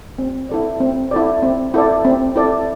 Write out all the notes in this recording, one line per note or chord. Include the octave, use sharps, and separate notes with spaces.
C4
E4 A4 D5
C4
E4 A4 D5
C4
E4 A4 D5
C4
E4 A4 D5